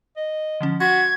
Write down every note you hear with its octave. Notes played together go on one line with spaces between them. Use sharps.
D#5
D3 F3 C#4
F#4 C6 G#6 B6